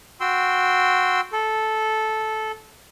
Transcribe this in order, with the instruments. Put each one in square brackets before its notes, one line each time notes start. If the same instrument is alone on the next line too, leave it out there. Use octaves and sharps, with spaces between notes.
[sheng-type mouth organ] F#4 G5 C6 E6
A4